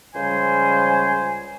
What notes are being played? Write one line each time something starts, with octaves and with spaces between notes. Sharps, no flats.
C#2 C#3 F3 G3 C5 G#5